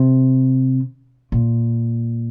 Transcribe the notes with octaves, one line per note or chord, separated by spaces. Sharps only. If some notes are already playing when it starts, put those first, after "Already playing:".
Already playing: C3
A#2